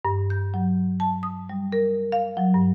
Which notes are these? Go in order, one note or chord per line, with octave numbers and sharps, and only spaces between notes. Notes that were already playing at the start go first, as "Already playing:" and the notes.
G2
G6
F#3
A5
D#6
G3
A#4
F5
F#3
G2